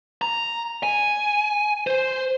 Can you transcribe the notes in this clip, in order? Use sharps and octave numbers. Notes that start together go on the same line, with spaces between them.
A#5
G#5
C5